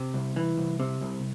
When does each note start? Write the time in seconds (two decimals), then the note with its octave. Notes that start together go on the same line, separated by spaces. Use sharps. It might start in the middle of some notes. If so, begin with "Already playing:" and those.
Already playing: C3
0.14 C2
0.36 E3
0.58 C2
0.80 C3
1.01 C2